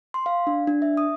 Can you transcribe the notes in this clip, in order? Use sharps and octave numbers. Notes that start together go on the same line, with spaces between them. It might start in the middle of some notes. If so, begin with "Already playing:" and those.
C6
F5
D4
D4
E5
D#6